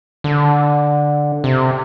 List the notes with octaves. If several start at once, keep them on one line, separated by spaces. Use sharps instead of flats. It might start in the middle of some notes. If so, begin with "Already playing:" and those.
D3
C3